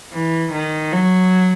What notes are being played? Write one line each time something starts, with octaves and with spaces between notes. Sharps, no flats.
E3
D#3
F#3